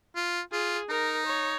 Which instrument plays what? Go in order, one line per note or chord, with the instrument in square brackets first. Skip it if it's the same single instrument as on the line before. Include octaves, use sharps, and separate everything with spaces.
[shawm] F4
[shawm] F4 [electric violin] G#4
[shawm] D#4 [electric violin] A#4
[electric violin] C#5